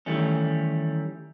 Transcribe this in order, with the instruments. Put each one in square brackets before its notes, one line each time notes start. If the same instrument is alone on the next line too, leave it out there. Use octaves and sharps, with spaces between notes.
[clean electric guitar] D#3 E3 G3 A3 C#4